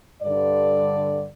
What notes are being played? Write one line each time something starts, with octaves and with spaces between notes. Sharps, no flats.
G2 D3 D5